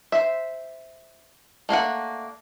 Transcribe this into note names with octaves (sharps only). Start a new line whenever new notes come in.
C5 E5
A3 A#3 D4 F#5